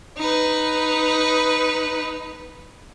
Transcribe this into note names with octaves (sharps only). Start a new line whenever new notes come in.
D#4 B4